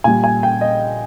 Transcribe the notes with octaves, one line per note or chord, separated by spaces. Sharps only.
A#2 G3 G#5
G#5
G5
D#5